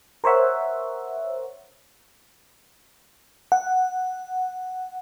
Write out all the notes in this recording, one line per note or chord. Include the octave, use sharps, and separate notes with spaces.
A#4 C5 C#5 E5 F#5
F#5